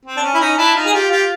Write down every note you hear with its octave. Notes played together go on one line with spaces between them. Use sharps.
C4
D4
C#4
E4
C#4 D#4
D4 E4
D#4 F4
G#4
F4 G4
F4 G4